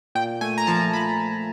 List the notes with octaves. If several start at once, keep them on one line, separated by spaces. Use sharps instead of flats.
A#2 G5
A3 G#5
A#5
F3 A5
F3 B5